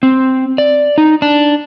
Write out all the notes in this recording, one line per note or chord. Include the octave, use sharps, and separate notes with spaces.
C4
D5
D#4
D4